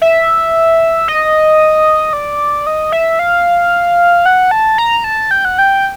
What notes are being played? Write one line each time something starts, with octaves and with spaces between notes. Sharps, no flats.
E5
D#5
D5
D#5
E5
F5
F#5
A5
A#5
A5
G5
F#5
G5